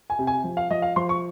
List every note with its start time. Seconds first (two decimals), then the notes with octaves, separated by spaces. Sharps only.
0.10 G#5
0.19 C3
0.27 G#5
0.44 F3
0.57 F5
0.71 F3 D#5
0.82 F5
0.96 F3 C6
1.09 C#6